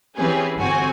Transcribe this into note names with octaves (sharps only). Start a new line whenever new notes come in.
E3 C4 C#4 G4 G#4 B4
G1 C4 F#4 G#5